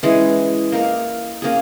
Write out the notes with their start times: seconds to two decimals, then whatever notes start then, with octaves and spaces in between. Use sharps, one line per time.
0.03 E3 G#3 C#4 G#4
0.72 A#3 D#4 A#4
1.42 A#3 C#4 G#4